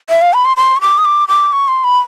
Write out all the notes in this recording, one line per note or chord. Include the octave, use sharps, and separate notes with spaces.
E5
F5
B5
C6
C6
C#6
D6
D#6
D6
D6
C#6
C6
B5